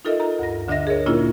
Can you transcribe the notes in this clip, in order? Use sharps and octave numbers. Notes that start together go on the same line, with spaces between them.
D#4 F4 A4 A#4 D#5 E5
A#5
D2 G2 A#6
D2 D3 D4 D#5 E5 A#6
G#4 A#4 C#5
A#2 A#3 C#4 D4 E4 F4